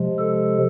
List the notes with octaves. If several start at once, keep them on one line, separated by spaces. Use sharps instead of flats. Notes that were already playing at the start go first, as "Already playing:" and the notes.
Already playing: C3 F3 G#3
A4